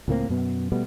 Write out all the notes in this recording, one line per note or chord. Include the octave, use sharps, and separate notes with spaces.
C#2 A2 A#3 C4
F#2 B2 B3
B2 G3 A3 B3